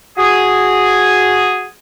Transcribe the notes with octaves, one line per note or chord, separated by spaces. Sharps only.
F#4 G#4